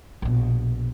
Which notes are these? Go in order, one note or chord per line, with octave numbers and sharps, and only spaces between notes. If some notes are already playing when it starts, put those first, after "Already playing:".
A#1 B2